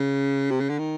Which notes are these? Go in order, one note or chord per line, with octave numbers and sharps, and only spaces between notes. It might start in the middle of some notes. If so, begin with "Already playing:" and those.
Already playing: C#3
C3
C#3
D3
D#3